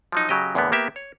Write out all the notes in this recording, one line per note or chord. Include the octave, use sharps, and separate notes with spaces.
F3 F#3 D#4
C#3 F#3 G4 A4 D#5
E2 A2 D3 A#3 B3
A#3 B3 G4 E5
C#5